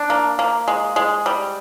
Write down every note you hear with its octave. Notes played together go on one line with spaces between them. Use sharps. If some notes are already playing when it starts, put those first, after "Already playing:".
Already playing: D4
A#3
A#3
G#3
G#3
G3